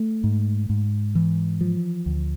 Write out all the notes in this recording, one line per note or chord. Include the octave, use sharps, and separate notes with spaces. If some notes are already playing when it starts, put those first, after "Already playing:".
Already playing: A3
G#2
G#2
E3
F3
D2